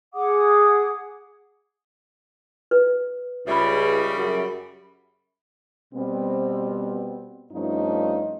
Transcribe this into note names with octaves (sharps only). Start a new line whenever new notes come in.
G#4 F#5 D6 D#6
B4
C#2 C#3 G3 E5 B5
F#2 G#4
B2 G3 B3 C4
G2 F3 A3 C#4 D#4 F4